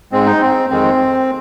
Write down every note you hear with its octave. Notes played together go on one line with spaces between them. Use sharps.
G#2 G#3 C4
D#4
C4
F2 D#3 G#3 C4